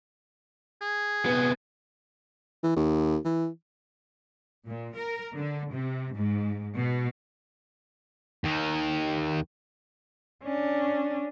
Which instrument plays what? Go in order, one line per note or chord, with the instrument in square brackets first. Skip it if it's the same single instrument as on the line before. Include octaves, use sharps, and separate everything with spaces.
[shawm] G#4
[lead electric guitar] C3 B3
[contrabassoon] E3
D#2
E3
[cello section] A#2
A#4
D3
C3
G#2
B2
[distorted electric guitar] D#2 D#3
[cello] C#4 D4